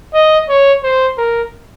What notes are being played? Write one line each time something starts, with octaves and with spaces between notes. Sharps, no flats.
D#5
C#5
C5
A#4